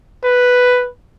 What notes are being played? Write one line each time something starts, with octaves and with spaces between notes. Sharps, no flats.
B4